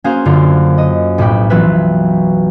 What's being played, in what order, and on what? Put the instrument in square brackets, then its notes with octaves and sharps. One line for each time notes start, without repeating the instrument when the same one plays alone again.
[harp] A#3 C#4 F#4 G#4 C5 F5
F#2 D3 F4
D#5
B1 A2 B3 G4 B5
E3 F#3 B3 F4 B4 E5